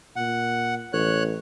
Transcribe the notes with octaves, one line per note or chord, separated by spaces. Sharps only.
A#2 F#5
A1 C#5 F#6